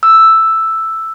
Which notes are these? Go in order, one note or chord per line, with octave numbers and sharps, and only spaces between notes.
E6